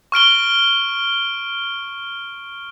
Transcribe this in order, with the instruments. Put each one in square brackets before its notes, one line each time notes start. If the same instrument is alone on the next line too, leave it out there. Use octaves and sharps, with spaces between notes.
[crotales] C#6 F6 D7 G7